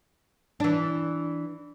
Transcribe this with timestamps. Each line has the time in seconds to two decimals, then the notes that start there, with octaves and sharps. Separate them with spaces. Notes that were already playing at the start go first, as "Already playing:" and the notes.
0.60 E3 D4